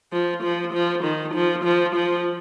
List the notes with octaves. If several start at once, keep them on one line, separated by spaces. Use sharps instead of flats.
F3
F3
F3
D#3
F3
F3
F3